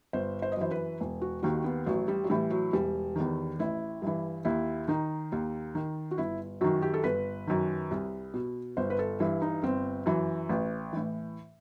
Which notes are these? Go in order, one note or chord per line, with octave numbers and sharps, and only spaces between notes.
G1 C5
C5
D#5
F#2 E3 C5
B4
E1
F#4
D#2 D#3 F#4
B3
A1 F#3
G3
F#3
A2 E3 G3
F#3
E1 G3
E2 D#3
A1 E4
G2 E3
D#2 E4
D#3 D#4
D#2
D#3
F#4
G1 E4
F#2 D#3 F#4
G4
A4
G1 B4
F#2 D#3
C2
B2
G1 C5
B4
A4
G2 E3 E4
D#4
G1 C4
F#2 E3
A1
A2 E3